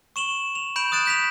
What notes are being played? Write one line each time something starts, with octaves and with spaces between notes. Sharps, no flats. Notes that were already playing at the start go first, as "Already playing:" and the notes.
C#6 E7 F#7 G7
F7
B5 G6 D7 E7 F#7
D#6 F#6 A6 D7 E7
G6 B6 D7 F7